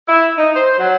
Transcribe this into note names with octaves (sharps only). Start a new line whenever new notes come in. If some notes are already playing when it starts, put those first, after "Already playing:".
E4
D#4
C5
F#3